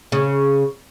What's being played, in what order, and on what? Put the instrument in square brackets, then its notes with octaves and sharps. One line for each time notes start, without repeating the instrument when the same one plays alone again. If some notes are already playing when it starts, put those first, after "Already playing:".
[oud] C#3